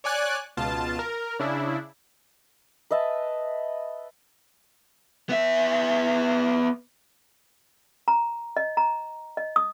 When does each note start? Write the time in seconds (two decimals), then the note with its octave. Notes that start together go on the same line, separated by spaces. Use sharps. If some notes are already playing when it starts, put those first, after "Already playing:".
0.04 C#5 D5 G#5 F#6
0.57 C#2 B2 F4 A5
0.99 A#4
1.39 C#3 D4 E4
2.91 B4 D#5 E5 A5
5.29 B3 E5
8.08 A#5
8.57 D#5
8.77 A#5
9.37 D#5
9.56 D#6